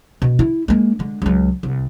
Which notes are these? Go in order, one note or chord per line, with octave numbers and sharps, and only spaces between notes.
B2
E4
G#3 A#3
D3 G#3
C#2 F#3
C2